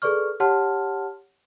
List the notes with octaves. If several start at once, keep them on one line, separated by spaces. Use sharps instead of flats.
G#4 A4 B4 D5 C#6 F6
G4 C#5 F#5 A5 C6 F6